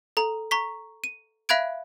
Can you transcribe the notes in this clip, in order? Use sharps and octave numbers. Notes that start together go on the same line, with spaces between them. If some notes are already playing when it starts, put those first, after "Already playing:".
A4 A#5
A#5 C#6 B6
D#7
E5 F5 B5 F#6 G#6 D7